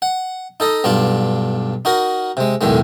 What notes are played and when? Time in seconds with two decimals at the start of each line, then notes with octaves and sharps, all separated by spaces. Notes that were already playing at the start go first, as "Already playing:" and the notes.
0.02 F#5
0.60 D#4 A4 D#5
0.84 B1 G2 D4 F4
1.85 D#4 F#4 A#4
2.37 C3 G#3
2.61 B1 E2 A2 D#3 G#3